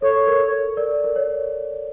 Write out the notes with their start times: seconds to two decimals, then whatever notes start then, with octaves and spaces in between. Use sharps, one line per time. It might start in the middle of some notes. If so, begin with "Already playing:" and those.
0.02 A4 C#5
0.27 A#4
0.77 A#4 D5
1.04 A#4
1.16 C#5